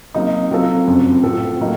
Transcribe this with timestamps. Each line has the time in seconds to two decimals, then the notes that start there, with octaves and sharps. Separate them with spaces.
0.14 C3 F#3 A#3 D#4
0.50 C3 F#3 C4 F4 A4
0.87 F#1 F2 C3
1.23 A2 F3 C4 F#4 A4
1.60 A2 F#3 A#3 D#4